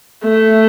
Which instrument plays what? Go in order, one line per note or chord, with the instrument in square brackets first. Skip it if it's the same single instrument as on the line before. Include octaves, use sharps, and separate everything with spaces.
[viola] A3